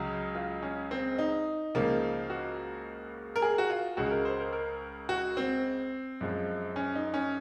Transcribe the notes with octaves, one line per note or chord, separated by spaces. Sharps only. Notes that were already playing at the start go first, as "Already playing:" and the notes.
Already playing: C#2 C#3 F#3
F4
C#4
C4
D#4
C#2 C#3 F3 A#3
F#4
A#4
G#4
F#4
F4
C#2 C#3 G#3 F#4
A#4
C5
A#4
A#4
F#4
C4
F#2 F3 G#3
C#4
D#4
C#4